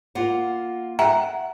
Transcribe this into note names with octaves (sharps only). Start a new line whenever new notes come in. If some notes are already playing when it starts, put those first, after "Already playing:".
A#3 F4 F#5
E5 F#5 G5 A#5